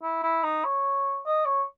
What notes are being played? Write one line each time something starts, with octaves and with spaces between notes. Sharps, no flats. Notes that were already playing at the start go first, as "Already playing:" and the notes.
E4
E4
D#4
C#5
D#5
C#5